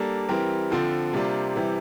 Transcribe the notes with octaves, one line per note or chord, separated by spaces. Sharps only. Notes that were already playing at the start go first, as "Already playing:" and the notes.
Already playing: G3 A#3 D4 A4
E3 G3 C4 G4 A#4
D3 F3 C4 F4 A4
C3 G3 A#3 D4 F4
C3 E3 G3